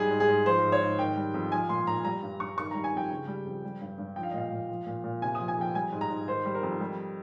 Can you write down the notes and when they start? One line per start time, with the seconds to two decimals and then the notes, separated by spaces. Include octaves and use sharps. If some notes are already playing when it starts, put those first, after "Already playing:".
Already playing: G#2 G3 G#4
0.10 G#2
0.20 G#4
0.29 G#2
0.46 F3 C5
0.64 G#2
0.72 C#5
0.82 G#2
0.99 D#3 G5
1.16 G3
1.34 F2
1.52 F3 G#5
1.69 A#2 C6
1.87 A#2 A#5
2.04 G3 A#5
2.23 G2
2.40 G2 C#6
2.57 D#3 C#6
2.71 G3 A#5
2.84 G#5
2.93 F2 G5
3.11 C#3
3.27 G3
3.45 F2
3.64 G3
3.81 G2
3.98 G2
4.16 F3 G5
4.23 F5
4.31 D#5
4.34 A#2 F5
4.51 A#2
4.69 F3
4.86 A#2
5.04 A#2
5.22 C3 G#5
5.35 F3 D#6
5.48 G#5
5.57 F2 G5
5.75 G3 G#5
5.92 G#2
6.01 A#5
6.10 G#2
6.28 D#3 C5
6.45 G3
6.54 A#4
6.63 F2
6.81 G3